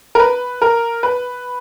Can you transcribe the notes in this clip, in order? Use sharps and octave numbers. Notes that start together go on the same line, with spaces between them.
A#4
B4
A#4
B4